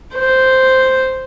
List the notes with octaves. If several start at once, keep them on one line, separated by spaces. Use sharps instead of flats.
C5